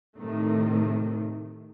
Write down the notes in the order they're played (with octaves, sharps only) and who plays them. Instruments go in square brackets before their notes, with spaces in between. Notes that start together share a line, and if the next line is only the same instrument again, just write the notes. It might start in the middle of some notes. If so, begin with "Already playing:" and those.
[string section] A2 C3 D#3 A3